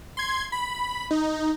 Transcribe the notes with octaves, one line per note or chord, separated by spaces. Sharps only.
C6 G#6
B5
D#4